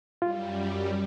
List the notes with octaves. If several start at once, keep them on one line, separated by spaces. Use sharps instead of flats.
F#2 G3 F4